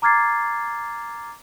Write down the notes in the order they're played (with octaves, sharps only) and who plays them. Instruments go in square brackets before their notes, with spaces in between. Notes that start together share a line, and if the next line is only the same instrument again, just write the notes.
[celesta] A#5 D6 F6 G#6 A6 C7